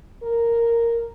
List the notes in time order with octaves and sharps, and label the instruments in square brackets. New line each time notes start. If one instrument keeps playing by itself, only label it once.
[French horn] A#4